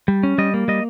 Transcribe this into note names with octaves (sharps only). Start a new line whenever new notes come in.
G3
C#4
G3 D#5
A#3
G3 D#5